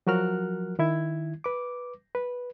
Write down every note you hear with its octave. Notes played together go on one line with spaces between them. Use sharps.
F3 F#3 F#4 A#4 F6 F#6
D#3 E4 G#6
B4 D6
B4